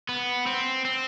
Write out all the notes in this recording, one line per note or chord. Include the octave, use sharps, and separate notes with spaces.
B3
C4
C4